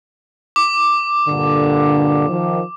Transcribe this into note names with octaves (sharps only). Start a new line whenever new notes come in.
D6
G2 A#2 D3
D#3 F3